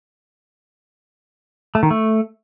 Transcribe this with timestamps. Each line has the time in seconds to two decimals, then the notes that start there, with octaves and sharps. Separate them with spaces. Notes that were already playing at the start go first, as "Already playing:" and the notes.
1.75 A3
1.83 D#3
1.91 A3